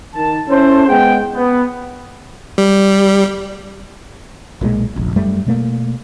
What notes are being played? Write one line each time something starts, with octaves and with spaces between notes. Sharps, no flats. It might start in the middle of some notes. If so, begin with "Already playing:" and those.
D#3 A5
C#4 E4 A4 C5
G#3 B3 G#4 F#5 G5
B3
G3
B1 A#2 D#3 G#3
F1 A#1
F#2 G3 A3
B2 A3 A#3